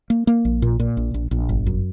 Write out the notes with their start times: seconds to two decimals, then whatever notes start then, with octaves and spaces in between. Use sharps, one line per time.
0.10 A#3
0.27 A#3
0.45 A#1
0.62 A#2
0.80 A#2
0.97 A#1
1.14 A#1
1.31 A#1
1.49 G1
1.66 F#2